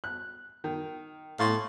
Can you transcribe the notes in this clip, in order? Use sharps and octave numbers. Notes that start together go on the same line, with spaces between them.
F#6
D#3
A2 F5 C6 C#6